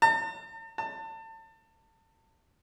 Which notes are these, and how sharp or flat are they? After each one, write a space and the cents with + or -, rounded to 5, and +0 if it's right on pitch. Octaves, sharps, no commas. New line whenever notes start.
A5 +45
A5 +30